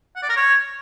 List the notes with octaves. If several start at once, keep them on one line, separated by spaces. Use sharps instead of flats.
F#5
D5
A#4
C#5